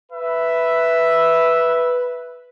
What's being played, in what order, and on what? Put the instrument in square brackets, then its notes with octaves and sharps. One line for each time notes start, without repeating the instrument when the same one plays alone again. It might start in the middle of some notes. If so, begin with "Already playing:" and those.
[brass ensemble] B4 [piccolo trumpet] E5